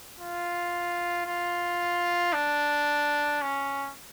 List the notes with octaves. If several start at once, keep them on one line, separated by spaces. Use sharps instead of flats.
F4
F4
D4
C#4